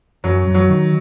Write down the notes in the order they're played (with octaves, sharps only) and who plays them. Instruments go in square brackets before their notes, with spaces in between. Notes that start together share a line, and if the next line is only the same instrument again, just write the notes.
[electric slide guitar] F#2 [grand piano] F#3
[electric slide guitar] F#2
[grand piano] F#3
[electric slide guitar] D#3